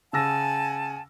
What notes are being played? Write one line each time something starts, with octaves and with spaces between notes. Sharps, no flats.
C#3 F#5 G#5 A5 E6 A#6